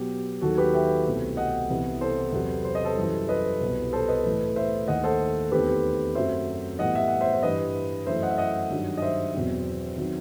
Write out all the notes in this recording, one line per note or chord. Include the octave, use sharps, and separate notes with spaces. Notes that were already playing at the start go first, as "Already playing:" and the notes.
Already playing: B2 F#3 B3 G4
D#2 D#3 F#3 F#4 A4
G4 B4
E5 G5
C2 B2 A3 C4
D#5 F#5
C2 C3 E3 B3
A4 C5
E2 C3 F#3 B3
C5
D#5
A4 C5
F#2 E3 G3
B4 D#5
C2 B2 G3 C4
A4 C5
B4 D#5
A2 E3 A3
C5 E5
D#2 D#3 A3 D#5 F#5
A4 C5
E2 D#3 A3 C4 G4 B4
F#2 F#3 A3 C4 C5 E5
A2 E3 G3 B3 D#5 F#5
E5
F#5
C5 E5
C5
G2 E3 G3 B4 D#5
F#2 E3 A3 C5 E5
D#5 F#5
E5
D#5 F#5
G2 D#3 F#3
D#5
C5 E5
E2 B2 F#3 C4
D#3 F#3 C4